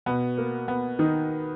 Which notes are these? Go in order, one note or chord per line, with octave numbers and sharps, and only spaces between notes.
B2 B3
A#3
B3
D#3 D#4